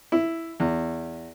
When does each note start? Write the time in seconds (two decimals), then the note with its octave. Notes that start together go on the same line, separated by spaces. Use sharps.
0.12 E4
0.60 E2